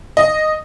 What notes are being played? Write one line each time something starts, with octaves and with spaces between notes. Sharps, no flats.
D#5